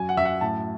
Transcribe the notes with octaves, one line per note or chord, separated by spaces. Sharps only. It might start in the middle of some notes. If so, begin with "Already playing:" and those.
Already playing: F#2 F#3 G#5
F#5
F#2 E5
F#5
A2 A5